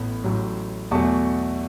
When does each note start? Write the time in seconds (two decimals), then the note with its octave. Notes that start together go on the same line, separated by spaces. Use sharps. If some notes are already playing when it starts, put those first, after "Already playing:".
Already playing: A1 A2 B3
0.24 A1 A2 F#3
0.91 E2 B2 F#3 A3 A5 C#6